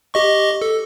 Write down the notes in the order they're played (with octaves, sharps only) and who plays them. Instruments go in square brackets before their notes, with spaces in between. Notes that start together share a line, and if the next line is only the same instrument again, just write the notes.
[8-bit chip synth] G4 D#5 C#6
A4